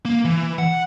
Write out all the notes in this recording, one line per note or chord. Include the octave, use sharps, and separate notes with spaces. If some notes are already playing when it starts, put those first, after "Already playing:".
A#3
E3
F#5